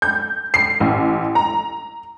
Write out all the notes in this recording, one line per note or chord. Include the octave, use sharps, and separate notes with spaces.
G6
C7
A1
A#5